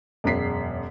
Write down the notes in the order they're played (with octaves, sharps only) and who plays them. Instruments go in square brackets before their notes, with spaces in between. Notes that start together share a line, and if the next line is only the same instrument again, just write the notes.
[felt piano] E1 F#2 G#4 B6 C7